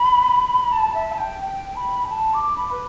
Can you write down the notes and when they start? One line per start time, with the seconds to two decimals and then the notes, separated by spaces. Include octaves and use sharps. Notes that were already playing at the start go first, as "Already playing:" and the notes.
Already playing: B5
0.71 A5
0.93 E5
1.11 A5
1.17 G5
1.40 G5
1.75 B5
2.05 G5
2.10 A5
2.33 D6
2.56 B5
2.71 B4